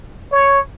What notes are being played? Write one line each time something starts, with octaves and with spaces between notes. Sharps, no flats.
C#5